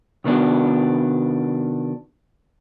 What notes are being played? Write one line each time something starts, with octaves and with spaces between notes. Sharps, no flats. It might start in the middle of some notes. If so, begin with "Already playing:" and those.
C3 D#3 B3 D4 F#4